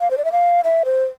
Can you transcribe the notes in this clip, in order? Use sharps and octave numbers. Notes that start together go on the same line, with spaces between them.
F5
C5
D5
E5
F5
E5
C5